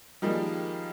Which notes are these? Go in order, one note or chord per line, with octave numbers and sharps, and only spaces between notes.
D#3 F3 G3 G#3 A#3